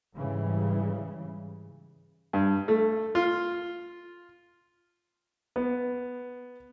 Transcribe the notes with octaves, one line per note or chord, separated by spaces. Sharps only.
G#2 C#3 E3 G3
G2
A3
F4
B3